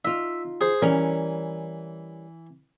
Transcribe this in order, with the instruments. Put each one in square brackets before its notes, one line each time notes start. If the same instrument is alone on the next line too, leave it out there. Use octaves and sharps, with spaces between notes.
[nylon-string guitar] D#4 F4 [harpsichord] E5
[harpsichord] G#4 C5
[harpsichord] E3 [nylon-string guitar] G3 C#4 A#4